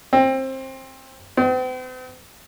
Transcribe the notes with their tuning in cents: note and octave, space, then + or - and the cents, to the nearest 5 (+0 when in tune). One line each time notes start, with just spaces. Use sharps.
C4 +20
C4 -45